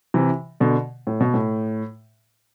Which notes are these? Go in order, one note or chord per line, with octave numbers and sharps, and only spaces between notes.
C3 E3
B2 D3
A2
B2
A2